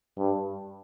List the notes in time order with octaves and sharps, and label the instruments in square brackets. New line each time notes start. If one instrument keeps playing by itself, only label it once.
[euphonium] G2